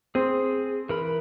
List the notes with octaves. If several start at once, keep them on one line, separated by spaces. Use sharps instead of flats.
C4 G#4
E3 A#4 B5